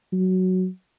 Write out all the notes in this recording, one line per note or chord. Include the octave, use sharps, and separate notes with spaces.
F#3